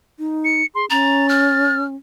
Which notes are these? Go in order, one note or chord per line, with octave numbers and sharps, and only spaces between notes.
D#4
C#7
G#4 C6
C#4 A#5 A6
F6